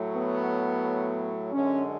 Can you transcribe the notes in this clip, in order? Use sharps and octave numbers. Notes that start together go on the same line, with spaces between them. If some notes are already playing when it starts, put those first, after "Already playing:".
Already playing: A2 F#3 A3
B3
F#2 D3 G#3 C#4